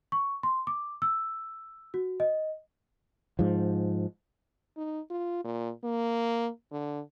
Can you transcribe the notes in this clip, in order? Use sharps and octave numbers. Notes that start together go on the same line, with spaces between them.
C#6
C6
D6
E6
F#4
D#5
G#2 F3
D#4
F4
A#2
A#3
D3